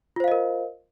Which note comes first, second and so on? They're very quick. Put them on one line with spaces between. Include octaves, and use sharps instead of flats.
F4 C5 F5 D#5 A#4